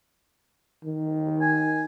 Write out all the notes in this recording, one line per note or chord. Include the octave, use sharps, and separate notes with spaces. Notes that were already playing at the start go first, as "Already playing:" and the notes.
D#3
G#5